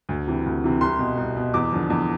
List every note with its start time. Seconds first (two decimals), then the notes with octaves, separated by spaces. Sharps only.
0.09 D2
0.27 C3 E3
0.46 D2
0.64 C3 E3
0.81 C2 C6
0.99 B2
1.17 C2
1.36 B2
1.54 E2 D6
1.72 D3 F3
1.90 E2